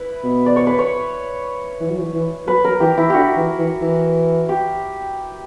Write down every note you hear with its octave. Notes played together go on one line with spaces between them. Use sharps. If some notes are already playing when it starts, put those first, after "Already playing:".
Already playing: E4 B4
B2
D5
C#5
B4
C#5
E3
F#3
E3
E3
F#3 B4
F#3 A#4
E3 G4
E3 E4
D3 F#4 G4
E3
E3
E3
G4